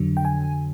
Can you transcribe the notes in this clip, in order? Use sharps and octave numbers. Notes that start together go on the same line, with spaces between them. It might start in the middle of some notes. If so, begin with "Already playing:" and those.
Already playing: F2 D3 F#3
G5
G#5